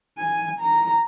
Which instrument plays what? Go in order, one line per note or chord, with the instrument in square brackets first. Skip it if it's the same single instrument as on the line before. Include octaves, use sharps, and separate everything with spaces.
[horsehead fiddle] G#5
A#5